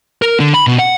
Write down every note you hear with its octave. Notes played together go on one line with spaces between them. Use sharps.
A#4
D3
B5
B2
F#5